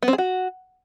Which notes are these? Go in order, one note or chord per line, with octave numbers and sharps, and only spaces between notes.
B3
C4
G#4
F#4